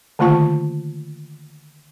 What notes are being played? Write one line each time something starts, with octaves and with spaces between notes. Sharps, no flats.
D3 D#3 A3 A#3 F4 A5